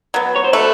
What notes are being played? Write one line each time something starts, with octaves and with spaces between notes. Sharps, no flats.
F#3 B3
C#5
C5
A3 A4 B4